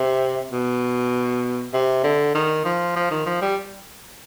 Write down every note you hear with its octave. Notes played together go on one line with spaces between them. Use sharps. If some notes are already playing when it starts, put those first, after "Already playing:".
Already playing: C3
B2
C3
D3
D#3
F3
F3
D#3
F3
G3